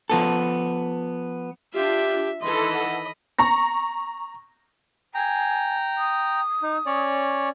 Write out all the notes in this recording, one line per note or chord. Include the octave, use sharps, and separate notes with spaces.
F3 B3 A4
D4 F4 G4 E5
D#3 E3 A4 D#5 B5 C6
F#5
A#5 C#6 A#6
G5 G#5 A#5
D#6
D#4
C#4 C#5 D5